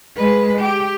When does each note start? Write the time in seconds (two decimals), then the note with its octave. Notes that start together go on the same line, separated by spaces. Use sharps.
0.17 G#3 B4
0.59 G4